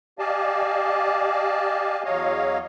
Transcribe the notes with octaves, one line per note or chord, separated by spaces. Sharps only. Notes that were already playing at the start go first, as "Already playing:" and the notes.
G4 D5 D#5 F5 G#5 A5
E2 F#3 C#5 D#5 F5